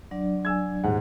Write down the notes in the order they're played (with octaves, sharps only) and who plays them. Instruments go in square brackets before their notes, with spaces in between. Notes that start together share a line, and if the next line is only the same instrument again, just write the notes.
[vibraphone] F#3 D4 D5
[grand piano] G#5 E6 G#6
D#1 G#2 F#5